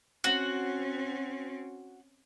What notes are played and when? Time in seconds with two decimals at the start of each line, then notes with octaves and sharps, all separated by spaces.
0.24 C4 C#4 F#4